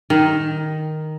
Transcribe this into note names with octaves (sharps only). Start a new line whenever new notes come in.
D#3